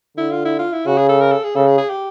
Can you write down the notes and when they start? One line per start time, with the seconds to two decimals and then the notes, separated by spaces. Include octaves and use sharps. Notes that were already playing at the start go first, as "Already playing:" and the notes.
0.17 D3 E4
0.32 F4
0.45 E4
0.59 F4
0.73 E4
0.86 C#3 F#4
0.98 G#4
1.09 A4
1.21 A#4
1.32 A4
1.44 G#4
1.55 C#3 A4
1.67 G#4
1.78 G#4
1.90 G4